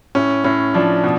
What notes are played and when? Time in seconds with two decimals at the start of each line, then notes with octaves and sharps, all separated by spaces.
0.15 A2 C#4
0.44 A2 C#4
0.74 F3 D4
1.04 B2